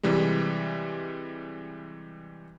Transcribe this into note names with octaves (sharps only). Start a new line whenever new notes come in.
C3 E3 G3 G#3